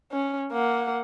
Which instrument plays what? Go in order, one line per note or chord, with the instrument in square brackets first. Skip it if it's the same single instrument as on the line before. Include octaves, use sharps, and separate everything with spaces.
[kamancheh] C#4
A#3 F#5